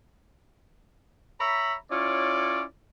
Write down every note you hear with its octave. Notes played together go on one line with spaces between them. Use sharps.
C#5 E5 A#5 B5
C#4 E4 F4 C#5 D5